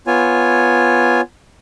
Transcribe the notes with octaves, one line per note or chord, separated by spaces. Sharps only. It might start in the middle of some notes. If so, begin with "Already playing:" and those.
B3 F4 C#5 G#5